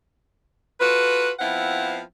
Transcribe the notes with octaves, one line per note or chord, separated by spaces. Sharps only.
F4 F#4 A4 B4
F3 B3 C4 E4 F5 F#5